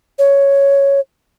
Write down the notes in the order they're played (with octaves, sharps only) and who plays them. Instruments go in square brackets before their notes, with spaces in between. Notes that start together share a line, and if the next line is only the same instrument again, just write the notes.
[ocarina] C#5